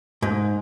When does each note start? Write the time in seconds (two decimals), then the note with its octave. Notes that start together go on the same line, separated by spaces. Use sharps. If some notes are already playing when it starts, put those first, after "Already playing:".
0.22 G#2